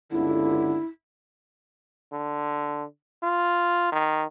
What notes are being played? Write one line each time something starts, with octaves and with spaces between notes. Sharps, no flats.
G1 C#2 D3 E4
D3
F4
D#3